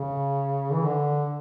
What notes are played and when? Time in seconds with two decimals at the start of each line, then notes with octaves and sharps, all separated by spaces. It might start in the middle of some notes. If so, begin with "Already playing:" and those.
Already playing: C#3
0.73 E3
0.85 D3